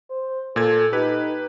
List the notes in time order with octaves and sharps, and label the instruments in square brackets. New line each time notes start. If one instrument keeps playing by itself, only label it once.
[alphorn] C5
[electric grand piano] A#2 G#6 [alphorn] A4
[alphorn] D#4 [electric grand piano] G4 B4